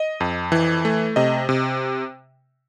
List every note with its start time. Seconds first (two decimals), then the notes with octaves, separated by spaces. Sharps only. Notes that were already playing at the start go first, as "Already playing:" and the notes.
Already playing: D#5
0.20 F2
0.52 E3
0.85 A3
1.16 C3 D#5
1.49 C3